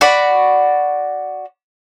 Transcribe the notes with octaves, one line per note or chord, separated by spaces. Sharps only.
F#4 D5 B5